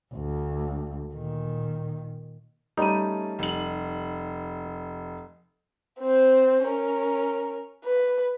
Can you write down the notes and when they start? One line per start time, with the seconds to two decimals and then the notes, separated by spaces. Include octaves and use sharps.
0.14 D2
1.14 A#2 D#3
2.77 G3 A3 C#4 D#4 D#7
3.39 F1 F#7
5.99 C4 C5
6.64 C#4 A#4
7.85 B4